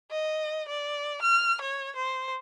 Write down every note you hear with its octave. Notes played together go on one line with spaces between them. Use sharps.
D#5
D5
F6
C#5
C5